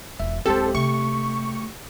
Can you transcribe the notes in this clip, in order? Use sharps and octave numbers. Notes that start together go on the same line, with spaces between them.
E1 E5
D1 G#3 C4 G4 A4 C5
C3 A3 C#6